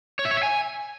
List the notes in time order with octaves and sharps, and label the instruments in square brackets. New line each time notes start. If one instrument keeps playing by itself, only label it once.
[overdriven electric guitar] C#5
E5
C#5
E5
G#5